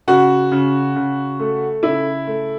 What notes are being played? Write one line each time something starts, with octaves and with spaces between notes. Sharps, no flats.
C#3 F#4
C#3
C#3
A3
C#3 E4
A3